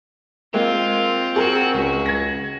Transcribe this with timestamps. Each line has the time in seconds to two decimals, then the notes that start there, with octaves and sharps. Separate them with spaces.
0.54 G#3 A#3 C4 F4
1.36 F#4 G#4 A#4 F#5
1.74 C#2 F#4
2.06 G#6 A#6